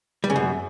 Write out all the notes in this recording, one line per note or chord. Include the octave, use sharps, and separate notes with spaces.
G3
C#3
F#2